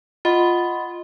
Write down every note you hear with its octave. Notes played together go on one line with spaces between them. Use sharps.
F4 D#5 F#5 B5